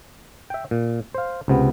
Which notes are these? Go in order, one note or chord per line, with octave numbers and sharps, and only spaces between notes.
E5 G5
A#2
C5 F5
C#2 C3 B3